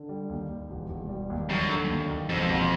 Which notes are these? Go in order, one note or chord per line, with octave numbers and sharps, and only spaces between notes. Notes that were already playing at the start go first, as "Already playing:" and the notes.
Already playing: D3
G3
D#2
D#2
E1
E1
G3
D#2
F#2 G3
D3
D#2
D#2
E1 F2
E1